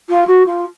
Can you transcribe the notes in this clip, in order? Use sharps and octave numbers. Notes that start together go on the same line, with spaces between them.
F4
F#4
F4